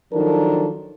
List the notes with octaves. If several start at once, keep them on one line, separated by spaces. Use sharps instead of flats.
D#3 F3 F#3 D4 A4 A#4